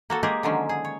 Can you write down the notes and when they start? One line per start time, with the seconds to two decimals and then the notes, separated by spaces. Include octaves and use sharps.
0.10 A#3 F#4 A4
0.23 G#3 A#3 G4 G#4 A#4
0.43 D3 D#3 F3 F#3 G#3 C#4
0.69 G#4
0.85 C#5